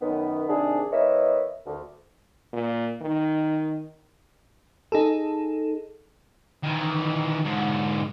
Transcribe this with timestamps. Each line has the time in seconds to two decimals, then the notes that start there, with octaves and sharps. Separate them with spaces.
0.02 F#2 D#3 B3
0.48 C3 D#3 D4 G#4
0.93 E3 B3 A#4 C#5 D#5 E5
1.66 D2
2.53 A#2
3.02 D#3
4.92 D#4 G#4 A4
6.63 D#3 E3
7.44 G#2 D3